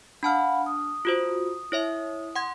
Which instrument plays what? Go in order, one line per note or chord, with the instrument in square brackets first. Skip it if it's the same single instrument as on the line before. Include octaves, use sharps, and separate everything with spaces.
[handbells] D4 A5 F6 [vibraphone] F5 F#5 B5
[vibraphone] D#6
[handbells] F4 F#4 C5
E4 C#5 E5
F#5 C6 G#6